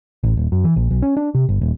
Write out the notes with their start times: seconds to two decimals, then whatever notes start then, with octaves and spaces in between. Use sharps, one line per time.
0.23 A1
0.37 D#1
0.52 F#2
0.64 E3
0.76 A#1
0.91 B1
1.02 C#4
1.17 D4
1.35 C3
1.49 G1
1.61 D#1